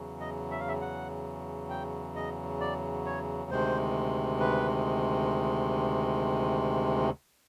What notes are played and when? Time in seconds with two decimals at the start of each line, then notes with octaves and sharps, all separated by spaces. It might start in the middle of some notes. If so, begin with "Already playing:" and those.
Already playing: E2 C#3 F#3
0.21 D#5
0.51 E5
0.60 F5
0.68 E5
0.81 F#5
1.70 G5
2.16 D#5
2.60 D5
3.06 C#5
3.51 D2 C3 D#3 G#3 C5
4.40 B4